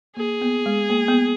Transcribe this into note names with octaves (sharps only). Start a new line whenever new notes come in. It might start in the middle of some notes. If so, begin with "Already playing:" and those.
A#3 G#4
B3
G#3
A#3
B3